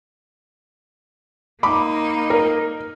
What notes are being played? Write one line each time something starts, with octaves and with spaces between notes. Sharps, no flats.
A#3 D#4 B5 D6
A#4